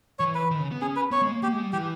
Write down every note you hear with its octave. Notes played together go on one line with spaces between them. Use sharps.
E3 C#5
B4
D#3
C#3
B3
C#4 G#4
B4
B3 C#5
G#3
A#3
A#3 G4
G#3
G3
E3 G4